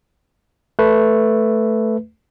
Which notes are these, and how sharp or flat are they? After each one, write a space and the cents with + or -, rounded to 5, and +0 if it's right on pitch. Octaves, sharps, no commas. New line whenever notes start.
A3 +0 B4 +0